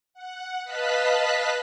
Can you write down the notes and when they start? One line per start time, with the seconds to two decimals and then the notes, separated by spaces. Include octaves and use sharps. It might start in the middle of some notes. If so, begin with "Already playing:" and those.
0.14 F#5
0.64 B4 D#5 F5 A5 F#6 B6